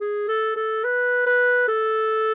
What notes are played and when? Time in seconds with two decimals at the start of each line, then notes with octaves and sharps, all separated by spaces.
0.01 G#4
0.28 A4
0.56 A4
0.84 B4
1.27 B4
1.68 A4